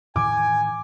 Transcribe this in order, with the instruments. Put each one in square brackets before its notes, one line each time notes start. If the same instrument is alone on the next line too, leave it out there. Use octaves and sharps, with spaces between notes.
[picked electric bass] A2 D#3 E3 [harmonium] G#5 [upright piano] D6